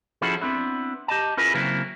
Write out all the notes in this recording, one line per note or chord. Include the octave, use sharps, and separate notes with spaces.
F3 C#4 E4 F#4 G#4 A4
B3 C4 D4 E4
G4 D#5 A5
C#4 E4 F4 G#4 A#4 B4
C#3 F#3 A#3 C4 E4